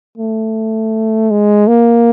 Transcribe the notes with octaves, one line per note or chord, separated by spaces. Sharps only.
A3
G#3
A#3